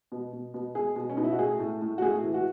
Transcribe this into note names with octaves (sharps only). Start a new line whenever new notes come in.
B2
B2
B2
B2 G#4
B2
C#4
B2 D#4
E4
F#4
A2 G#4
A2
A2
F#4
A2 G#4
E3
F#4